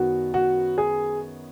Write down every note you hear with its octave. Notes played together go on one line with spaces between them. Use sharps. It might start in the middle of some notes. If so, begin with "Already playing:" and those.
Already playing: F#2 D#3 F#3 B3 F#4
F#4
G#4